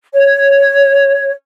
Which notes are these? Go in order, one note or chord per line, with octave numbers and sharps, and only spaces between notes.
C#5